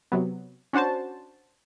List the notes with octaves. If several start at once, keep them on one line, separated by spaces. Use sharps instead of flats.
C3 F#3 B3
C#4 D4 F#4 C5 A5